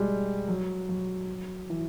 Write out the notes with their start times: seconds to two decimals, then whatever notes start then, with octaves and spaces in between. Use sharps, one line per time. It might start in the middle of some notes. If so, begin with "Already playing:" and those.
Already playing: G3 G#3
0.48 F#3
0.89 F#3
1.70 E3